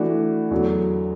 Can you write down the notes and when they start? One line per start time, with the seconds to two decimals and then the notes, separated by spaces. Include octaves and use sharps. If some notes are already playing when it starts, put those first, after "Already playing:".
Already playing: E3 A3 D4 F#4
0.51 E2 D3 F#3